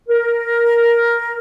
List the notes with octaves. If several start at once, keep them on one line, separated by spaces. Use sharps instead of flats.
A#4